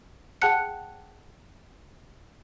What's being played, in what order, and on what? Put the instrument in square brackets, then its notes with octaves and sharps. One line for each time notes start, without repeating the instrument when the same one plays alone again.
[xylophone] G#4 F#5 G5 A5 F#6 C#7